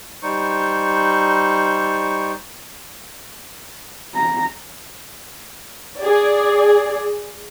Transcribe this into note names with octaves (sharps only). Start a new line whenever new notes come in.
G3 D#4 C5 C#6
A#5
G#4 D5